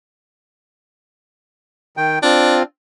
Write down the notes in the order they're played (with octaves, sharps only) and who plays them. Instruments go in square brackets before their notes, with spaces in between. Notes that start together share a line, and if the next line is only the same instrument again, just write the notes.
[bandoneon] D#3 G5
[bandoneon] C4 F4 [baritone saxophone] D4